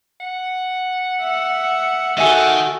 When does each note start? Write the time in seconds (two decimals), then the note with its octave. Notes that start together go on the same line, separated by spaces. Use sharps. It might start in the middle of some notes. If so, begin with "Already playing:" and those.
0.20 F#5
1.21 E5
2.18 D#3 F#4 A4 E5 G#5